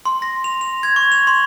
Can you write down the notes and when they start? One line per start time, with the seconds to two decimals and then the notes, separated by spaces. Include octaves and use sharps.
0.06 C6
0.22 A#6
0.44 F7
0.61 F7
0.83 G#6
0.96 C#6
1.12 F7
1.27 C6